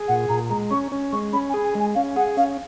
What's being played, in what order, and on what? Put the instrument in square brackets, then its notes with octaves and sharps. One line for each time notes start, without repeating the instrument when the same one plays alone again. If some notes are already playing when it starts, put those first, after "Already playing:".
Already playing: [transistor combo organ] G#4
[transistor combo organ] A#2 [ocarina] F#5
[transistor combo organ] A#2 [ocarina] A#5
[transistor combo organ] G#3 [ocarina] A#5
[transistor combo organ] C#4 [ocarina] C#6
[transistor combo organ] C#4
[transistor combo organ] G#3 [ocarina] C#6
[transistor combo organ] C#4 [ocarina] B5
[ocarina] G#5
[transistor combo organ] G#4
[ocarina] G#5
[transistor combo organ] G#3
[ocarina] G#5
[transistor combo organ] C#4 [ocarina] F5
[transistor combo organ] G#4 [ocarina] F#5
[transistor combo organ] C#4 [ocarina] F5